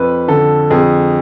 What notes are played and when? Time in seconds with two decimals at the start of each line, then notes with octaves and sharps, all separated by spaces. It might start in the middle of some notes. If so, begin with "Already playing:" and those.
Already playing: F2 B4
0.28 D3 A4
0.70 F2 G#4